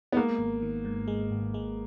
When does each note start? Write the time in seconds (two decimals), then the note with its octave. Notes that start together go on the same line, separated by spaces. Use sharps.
0.12 B3
0.16 G#3 A#3
0.39 G#1
0.62 D#3
0.85 G#2
1.08 G#3
1.31 G#1
1.54 G#3